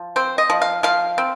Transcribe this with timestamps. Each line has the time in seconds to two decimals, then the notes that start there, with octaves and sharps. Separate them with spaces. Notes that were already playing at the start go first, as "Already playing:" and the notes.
Already playing: F3
0.16 C4 C5
0.38 D#5
0.50 F3
0.62 F5
0.83 F3 F5
1.18 C4